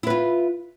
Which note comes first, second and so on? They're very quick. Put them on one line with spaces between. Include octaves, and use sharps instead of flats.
E4 B4 F4